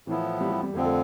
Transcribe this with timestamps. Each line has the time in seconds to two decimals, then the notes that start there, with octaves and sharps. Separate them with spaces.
0.07 A2 E3 F3 B3 E4
0.41 G3
0.51 G3
0.63 G3
0.74 F2 D3 F3 A3 C4
0.85 A3